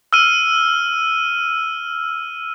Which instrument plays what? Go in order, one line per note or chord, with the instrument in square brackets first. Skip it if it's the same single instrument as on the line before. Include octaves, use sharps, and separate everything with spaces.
[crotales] E6 F6 D#7